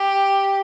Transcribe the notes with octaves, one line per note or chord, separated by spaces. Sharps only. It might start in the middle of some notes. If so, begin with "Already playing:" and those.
Already playing: G4